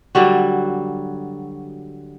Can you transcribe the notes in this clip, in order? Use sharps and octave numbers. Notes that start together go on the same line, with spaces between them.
D3 F#3 G3 F#4